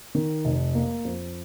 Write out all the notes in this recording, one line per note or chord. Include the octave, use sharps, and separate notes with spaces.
D#3
F1
A#3
F2